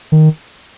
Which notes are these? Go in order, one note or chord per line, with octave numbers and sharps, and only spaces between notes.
D#3